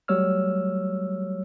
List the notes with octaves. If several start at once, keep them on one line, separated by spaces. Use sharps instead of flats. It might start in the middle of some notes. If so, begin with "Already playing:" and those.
F#3 G3 A3 C#5 E6 F6